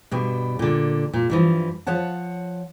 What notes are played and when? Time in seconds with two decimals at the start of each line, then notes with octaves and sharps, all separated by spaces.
0.11 G2 B2 G4
0.59 A#2 D3
1.13 A#2
1.30 G2 E3 F3
1.87 F3 C#5 F#5 A5